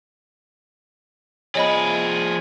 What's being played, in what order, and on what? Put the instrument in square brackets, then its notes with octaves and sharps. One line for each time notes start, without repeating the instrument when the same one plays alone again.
[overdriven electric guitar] F3 G#4 [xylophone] C#5 D#5 B5